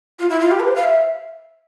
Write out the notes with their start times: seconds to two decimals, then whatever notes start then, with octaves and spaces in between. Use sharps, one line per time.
0.19 F4
0.30 E4
0.40 F4
0.51 G4
0.60 B4
0.68 C5
0.76 F5
0.84 E5